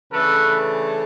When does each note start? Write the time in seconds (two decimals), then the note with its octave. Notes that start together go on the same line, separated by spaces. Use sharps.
0.12 C#3 E3 A3 D4 A4 B4